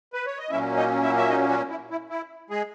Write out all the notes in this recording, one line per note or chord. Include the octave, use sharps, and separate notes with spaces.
B4
C#5
D#5
A#2 F#3 A#3 C#4 E4 E5
D#4 D#5
E4 E5
E5
D#4 D#5
F#3 F#4
E4
E4
E4
G#3 G#4